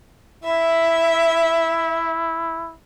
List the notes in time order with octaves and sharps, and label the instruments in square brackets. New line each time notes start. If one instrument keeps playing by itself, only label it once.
[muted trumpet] E4 [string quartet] E5